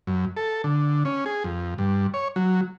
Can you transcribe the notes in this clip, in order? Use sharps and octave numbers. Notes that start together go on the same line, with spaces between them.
F#2
A4
D3
C#4
G#4
F2
G2
C#5
F#3